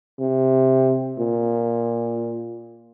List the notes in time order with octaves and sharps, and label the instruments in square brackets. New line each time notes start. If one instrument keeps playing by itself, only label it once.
[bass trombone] C3
A#2